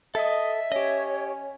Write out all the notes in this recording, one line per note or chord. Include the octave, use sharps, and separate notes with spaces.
A4 D#5 E5
C#4 G4 C#5 D#5